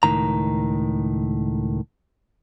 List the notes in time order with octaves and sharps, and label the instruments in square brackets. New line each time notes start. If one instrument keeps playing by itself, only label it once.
[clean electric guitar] C#2 A2 D#3 A#5